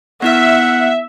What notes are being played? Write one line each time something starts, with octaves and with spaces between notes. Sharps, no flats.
B3 E4 E5 F#5 F6